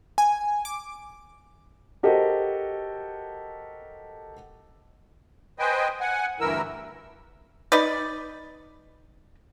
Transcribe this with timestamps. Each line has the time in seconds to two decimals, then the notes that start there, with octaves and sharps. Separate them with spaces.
0.18 G#5
0.65 D6
2.03 F#4 G4 A4 A#4 C5 D#5
5.59 B4 C5 D#5 G5 G#5
6.00 F#5 G#5
6.40 D2 G2 E3 E4 A#4 E6
7.72 D#4 B4 D5